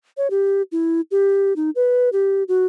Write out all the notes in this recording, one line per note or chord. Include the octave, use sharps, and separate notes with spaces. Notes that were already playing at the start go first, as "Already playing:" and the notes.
C#5
G4
E4
G4
D#4
B4
G4
F#4